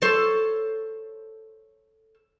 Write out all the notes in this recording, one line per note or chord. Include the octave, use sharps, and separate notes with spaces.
A4 C5 C#5